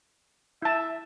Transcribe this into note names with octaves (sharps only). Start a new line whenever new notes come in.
E4 E5 A5